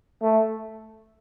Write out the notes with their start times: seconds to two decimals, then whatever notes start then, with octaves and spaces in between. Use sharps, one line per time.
0.22 A3